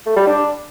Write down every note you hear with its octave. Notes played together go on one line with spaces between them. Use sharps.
A3
G3
D4